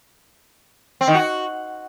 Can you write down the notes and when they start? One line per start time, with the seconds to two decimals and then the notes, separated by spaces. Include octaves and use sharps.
1.01 C4
1.08 D#3
1.14 F#4